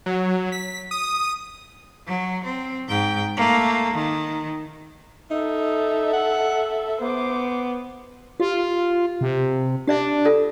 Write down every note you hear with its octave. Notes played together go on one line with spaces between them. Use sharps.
F#3
B6
D#6
F#3
C4
G#2 G5
A3 A#3
D#3
D#4 A4 E5
F#5
B3 C5 D6
F4 G4
C3
D4 G4 D5 E5
F4 A4 D5